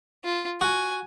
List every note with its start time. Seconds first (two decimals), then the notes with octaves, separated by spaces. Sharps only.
0.24 F4
0.61 F#4 G#5